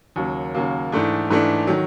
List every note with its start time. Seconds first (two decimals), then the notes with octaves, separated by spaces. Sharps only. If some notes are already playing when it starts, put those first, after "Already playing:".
0.16 D#2 C#3 F#3 A#3
0.55 D#2 C#3 F#3 A#3
0.92 G#2 E3 A3 D4
1.30 G#2 E3 A3 D4
1.67 D#3 F#3